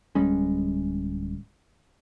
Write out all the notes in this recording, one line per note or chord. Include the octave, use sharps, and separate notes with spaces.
D1 G3 G#3 C#4